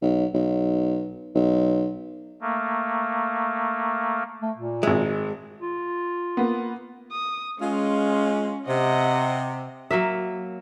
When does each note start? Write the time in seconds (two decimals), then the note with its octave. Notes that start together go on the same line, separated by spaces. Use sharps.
0.02 B1
0.34 B1
1.35 B1
2.41 A3 A#3
4.42 A3
4.57 A#2
4.83 G#1 G#3 E5
5.62 F4
6.37 A#3 B3
7.12 D#6
7.61 G#3 C#4 F4
8.68 C3 D#5 F#5
9.91 F#3 A#3 E5